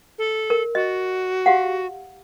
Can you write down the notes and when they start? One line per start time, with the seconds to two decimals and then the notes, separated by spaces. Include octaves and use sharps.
0.18 A4
0.50 A#4
0.75 F#4 D#5
1.46 G4 F5 F#5